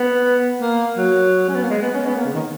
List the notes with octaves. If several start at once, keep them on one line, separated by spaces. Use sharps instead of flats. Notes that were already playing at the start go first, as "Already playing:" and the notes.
Already playing: B3
A#3
F#3
C#4
B3
A#3
G#3
B3
C#4
B3
A#3
C#3
D#3